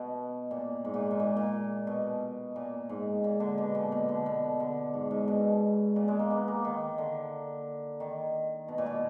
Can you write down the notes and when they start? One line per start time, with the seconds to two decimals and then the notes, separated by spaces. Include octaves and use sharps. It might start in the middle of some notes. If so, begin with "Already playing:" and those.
Already playing: B2
0.51 A#2
0.85 G#2
0.94 A#2
1.11 G#2
1.20 A#2
1.37 A#2
1.87 B2
2.56 A#2
2.89 G#2
3.24 A#2
3.40 D3
3.58 B2
3.75 A#2
3.92 B2
4.09 D3
4.26 B2
4.60 D3
4.94 G#2
5.11 G#2
5.28 B2
5.96 A#2
6.08 G#3
6.19 A#3
6.31 B3
6.48 A#3
6.65 D#3
6.98 D3
8.00 D#3
8.68 B2
8.78 A#2
8.86 B2